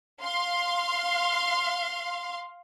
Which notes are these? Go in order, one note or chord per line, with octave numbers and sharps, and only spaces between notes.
F5 C6